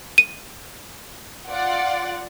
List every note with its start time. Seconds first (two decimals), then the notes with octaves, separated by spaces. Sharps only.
0.18 D#7
1.49 F4 D5 F#5